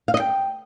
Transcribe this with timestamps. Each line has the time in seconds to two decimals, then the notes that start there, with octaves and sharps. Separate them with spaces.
0.08 F5
0.14 D#5
0.20 G5